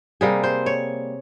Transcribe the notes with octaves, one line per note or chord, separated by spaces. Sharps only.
C3 G3 A#3 G#4
C5
C#5